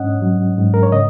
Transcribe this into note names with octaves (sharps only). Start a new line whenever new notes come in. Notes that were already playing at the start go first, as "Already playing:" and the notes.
Already playing: G#2 C#4 D#5 F#5
F#3
G#2
A#4
C#5
C#3 D#5